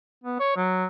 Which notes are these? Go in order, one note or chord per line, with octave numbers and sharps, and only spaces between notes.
B3
C#5
F#3